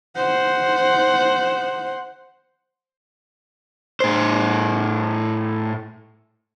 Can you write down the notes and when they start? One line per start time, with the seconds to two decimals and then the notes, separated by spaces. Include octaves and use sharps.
0.16 C5 F#5
4.00 A2 C5